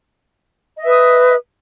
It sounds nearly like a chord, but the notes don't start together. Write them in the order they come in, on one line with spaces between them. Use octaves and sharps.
D#5 E5 B4 D#6